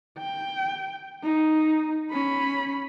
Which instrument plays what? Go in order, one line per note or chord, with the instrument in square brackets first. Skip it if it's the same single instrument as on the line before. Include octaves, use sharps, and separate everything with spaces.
[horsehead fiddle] G5
D#4
C#4 B5